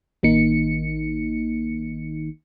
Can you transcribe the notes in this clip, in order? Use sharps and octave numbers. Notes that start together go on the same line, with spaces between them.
A1 D#3 A#3 D#4 C#7